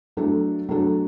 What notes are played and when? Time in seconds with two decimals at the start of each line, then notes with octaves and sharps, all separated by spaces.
0.17 F#3 A3 D4 A4
0.69 F#3 A3 D4 A4